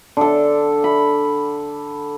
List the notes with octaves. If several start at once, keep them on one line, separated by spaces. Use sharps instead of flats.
D3 A4
B5